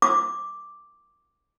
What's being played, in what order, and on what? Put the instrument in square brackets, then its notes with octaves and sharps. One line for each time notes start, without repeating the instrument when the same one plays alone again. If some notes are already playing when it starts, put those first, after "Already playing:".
[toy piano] D6